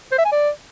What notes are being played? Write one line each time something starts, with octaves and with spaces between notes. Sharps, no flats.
C5
E5
G#5
D5